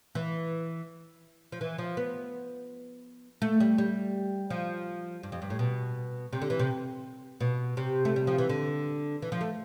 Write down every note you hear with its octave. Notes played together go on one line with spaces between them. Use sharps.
E3
F3
E3
F3
B3
A3
G3
G3
F3
G2
F2
G2
A2
B2
C3
D3
E3
C3
B2
C3
A3
G3
F3
E3
D3
E3
F3
A3